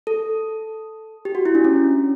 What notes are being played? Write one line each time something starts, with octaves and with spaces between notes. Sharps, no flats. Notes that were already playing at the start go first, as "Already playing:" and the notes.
A4
G4
F#4
E4
D4
C#4